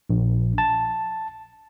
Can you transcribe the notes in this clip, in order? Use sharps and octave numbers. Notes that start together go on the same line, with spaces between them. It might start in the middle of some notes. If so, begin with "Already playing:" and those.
A#1
A5